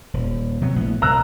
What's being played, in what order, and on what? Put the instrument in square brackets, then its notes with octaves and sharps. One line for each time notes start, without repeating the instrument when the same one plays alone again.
[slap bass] D#1
C3 F#3 B3
A#1 A2 B3
[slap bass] C2 [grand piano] A#5 E6 F#6